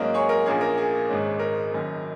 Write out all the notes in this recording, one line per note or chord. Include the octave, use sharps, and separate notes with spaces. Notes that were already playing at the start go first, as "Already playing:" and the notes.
Already playing: G#2 F#3 A#3 C#4 A#4 D#5
G#4 C#5
A#4
A#1 A#2 A#3 C#4 G#4
A#4
G#4
G#1 G#2 G#3 C#4
A#4
F#1 F#2 D#3